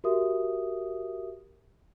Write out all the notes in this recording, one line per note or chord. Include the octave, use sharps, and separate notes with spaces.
F#4 G4 A#4 E5 D#6